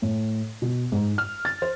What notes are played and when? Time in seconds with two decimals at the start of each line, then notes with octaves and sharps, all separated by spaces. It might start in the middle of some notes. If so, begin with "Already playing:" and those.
0.02 A2
0.62 B2
0.92 G#2
1.18 F6
1.45 A6
1.62 C5